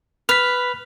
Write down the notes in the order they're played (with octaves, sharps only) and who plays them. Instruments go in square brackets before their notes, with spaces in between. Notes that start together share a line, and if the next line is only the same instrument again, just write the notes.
[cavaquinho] B4 [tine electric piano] F6 B6